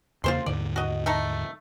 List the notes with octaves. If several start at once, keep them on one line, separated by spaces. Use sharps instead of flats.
E2 C#3 A#3 F4 C5 C6
D#2 G#2 D3 D5
F#4 D#5
A3 D#4 A4